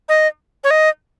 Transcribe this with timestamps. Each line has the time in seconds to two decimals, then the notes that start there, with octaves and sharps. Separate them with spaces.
0.09 D#5
0.64 C#5
0.71 D#5